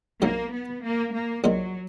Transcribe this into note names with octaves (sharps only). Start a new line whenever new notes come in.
A#1 G#2 F#3 A#3
B3
A#3
A#3
A#1 A#2 F#3 G#3